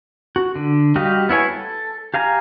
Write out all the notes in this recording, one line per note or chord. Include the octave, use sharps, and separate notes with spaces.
F#4
D3
G3 F#4 G4 D#5 F5
B3 E4 C#5 G#5
A4
G4 F5 G#5 A#5